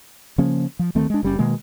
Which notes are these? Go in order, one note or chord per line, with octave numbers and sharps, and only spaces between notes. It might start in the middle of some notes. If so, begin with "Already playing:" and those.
C#3 F3 A#3 C#4
F3
D2 D#3 A3 C4
G#3 D4
F#1 G3 C#4
B2 D#3 G#3 A#3